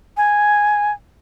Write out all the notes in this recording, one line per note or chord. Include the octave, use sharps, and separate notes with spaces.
G#5